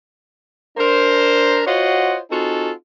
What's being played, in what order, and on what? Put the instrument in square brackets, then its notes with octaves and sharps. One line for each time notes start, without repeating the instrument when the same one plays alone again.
[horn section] D4 A#4 C5
F4 F#4 C5 C#5 D#5 F#5
C4 D#4 F4 F#4 G#4 A4